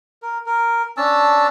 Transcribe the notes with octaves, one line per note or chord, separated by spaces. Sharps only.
A#4
A#4
C#4 D4 A5 E6